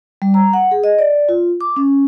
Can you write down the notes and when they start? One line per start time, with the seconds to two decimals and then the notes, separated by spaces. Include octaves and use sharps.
0.22 G3
0.34 A#5
0.53 F#5
0.71 G#4
0.84 D#5
0.99 D5
1.29 F4
1.61 D6
1.76 C#4